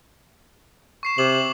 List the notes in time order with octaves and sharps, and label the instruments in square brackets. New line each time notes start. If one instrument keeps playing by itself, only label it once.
[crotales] C#6 C7 E7
[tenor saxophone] C3 [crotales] D6 E7 F#7